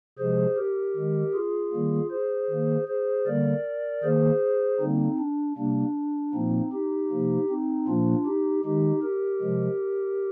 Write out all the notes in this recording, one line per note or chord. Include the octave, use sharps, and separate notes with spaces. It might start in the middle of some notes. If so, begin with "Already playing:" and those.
C3 F3 G#3 G#4 C5
G4 A#4
D#3 G#3
F4 G#4
D#3 G3 A#3
G#4 C5
D#3 A#3
G#4 C5
D3 G3 A#3 A#4 D5
D#3 A#3 G#4 C5
D3 G3 A#3 C4 D#4
D4
C3 G3 A#3 D4
A#2 F3 A#3 C4 D#4
D#4 G4
C3 F3 A#3
C4 D#4
A#2 F3 A#3 D4 F4
D#4 G4
D#3 G#3 D#4 G4
G4 A#4
C3 F3 G#3